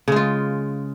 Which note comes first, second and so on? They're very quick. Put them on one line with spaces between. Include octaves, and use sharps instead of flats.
C#3 G#3 F4